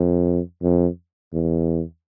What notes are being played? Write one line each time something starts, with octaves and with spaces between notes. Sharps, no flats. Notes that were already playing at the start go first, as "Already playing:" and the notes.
Already playing: F2
F2
E2